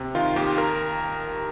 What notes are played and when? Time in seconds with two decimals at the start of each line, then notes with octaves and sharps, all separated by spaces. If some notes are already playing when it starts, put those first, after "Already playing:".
Already playing: C3
0.15 D#3 F4
0.36 D#2 G4
0.58 A#4